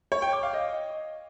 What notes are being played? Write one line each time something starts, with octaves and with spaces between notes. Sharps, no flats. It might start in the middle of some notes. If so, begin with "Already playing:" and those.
C#5
G5
D6
F5
D#5